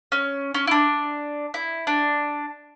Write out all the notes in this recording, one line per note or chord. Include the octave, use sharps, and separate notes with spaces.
C#4
C#4
E4
D4
E4
D4